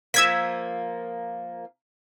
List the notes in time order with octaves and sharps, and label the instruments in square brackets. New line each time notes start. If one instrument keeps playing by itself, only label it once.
[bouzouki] F3 A#3 [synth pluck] E6 G#6 B6